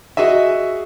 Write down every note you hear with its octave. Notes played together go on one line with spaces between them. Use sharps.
F#4 G#4 D#5 E5